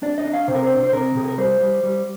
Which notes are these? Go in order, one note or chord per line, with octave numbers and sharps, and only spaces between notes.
D4 D5
D#5
D4
F5
C3 C5
A#4
C5
D4
C5
C3 A#4
C3 G#4
A#4
G3 C5
G3
G3